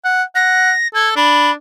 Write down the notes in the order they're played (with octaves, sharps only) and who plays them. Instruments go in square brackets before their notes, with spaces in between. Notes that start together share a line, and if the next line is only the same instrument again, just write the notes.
[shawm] F#5
[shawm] F#5 [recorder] A#6
[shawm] A4 [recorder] G#6
[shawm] D4 [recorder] B5